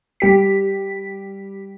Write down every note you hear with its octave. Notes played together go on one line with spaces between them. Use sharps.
G3 G4 B6